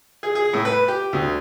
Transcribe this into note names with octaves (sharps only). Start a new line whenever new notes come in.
G#4
G#4
A2
B4
G4
D2